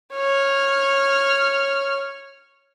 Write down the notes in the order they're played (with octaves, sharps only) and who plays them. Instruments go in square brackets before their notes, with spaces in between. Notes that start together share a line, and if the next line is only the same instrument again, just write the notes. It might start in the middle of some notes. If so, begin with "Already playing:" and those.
[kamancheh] C#5 F6